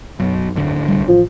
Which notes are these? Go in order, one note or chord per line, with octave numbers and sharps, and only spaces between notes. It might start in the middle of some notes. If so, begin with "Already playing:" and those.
B1 F#2
G#1 D2 D3
C2 G3
A1 F3